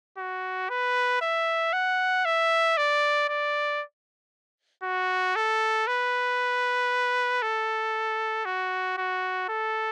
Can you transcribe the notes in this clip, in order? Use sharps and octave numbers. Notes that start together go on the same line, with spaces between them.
F#4
B4
E5
F#5
E5
D5
D5
F#4
A4
B4
A4
F#4
F#4
A4